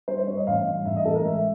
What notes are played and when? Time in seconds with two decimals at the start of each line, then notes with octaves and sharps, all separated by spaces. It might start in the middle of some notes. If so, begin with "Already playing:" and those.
0.08 G2 C5
0.24 C5
0.28 G2 C#5
0.37 D#5
0.47 A1 F5
0.66 G2
0.86 A1 E5
0.96 D#5
1.05 A1 A4
1.15 A#4
1.25 G#3 E5